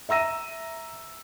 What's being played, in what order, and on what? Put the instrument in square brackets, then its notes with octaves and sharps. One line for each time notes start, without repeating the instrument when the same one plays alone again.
[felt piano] E5 A#5 E6 A#6 D#7